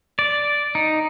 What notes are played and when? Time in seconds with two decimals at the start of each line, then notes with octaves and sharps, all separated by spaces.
0.19 D5
0.75 D#4